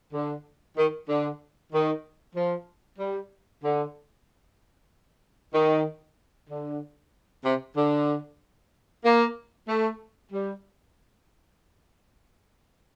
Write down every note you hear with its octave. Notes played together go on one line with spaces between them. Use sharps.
D3
D#3
D3
D#3
F3
G3
D3
D#3
D3
C3
D3
A#3
A3
G3